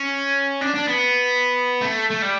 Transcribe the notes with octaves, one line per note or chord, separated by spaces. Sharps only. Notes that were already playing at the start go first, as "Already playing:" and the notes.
Already playing: C#4
D4
D4
B3
A3
A3
G3